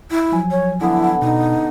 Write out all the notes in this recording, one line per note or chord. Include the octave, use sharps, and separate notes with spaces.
E4
F3 F#3 G#5
C#5
D3 B3 E4
B2 D#4